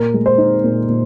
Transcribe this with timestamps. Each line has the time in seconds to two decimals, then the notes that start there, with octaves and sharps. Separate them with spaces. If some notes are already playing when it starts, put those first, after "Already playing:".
Already playing: A#2 A#4
0.14 G#3
0.26 C5
0.38 D#4
0.64 A#2
0.89 A#2